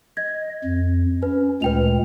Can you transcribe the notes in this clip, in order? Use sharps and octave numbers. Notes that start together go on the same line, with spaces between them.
D#5 G#6
F2
C#4 B4
D2 A#2 G#3 B4 G5 F7